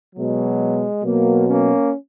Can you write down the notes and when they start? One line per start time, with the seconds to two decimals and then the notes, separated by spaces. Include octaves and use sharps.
0.15 B2 F#3 G#3
1.03 B2 F#3 A#3
1.47 A#3 C#4